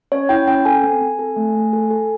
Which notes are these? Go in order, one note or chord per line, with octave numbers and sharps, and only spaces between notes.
C#4 C#5
E4 G5
C#4 G5
A4 G#5
C4
C4
A4
A3
A3
A4
A4